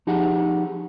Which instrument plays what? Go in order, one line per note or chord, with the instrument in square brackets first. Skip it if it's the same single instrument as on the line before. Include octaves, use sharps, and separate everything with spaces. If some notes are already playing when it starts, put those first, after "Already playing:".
[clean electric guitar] F3 D#4 G4 G#4 F#5